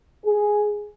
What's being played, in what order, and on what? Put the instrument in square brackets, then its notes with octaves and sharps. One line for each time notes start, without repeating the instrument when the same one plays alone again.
[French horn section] G#4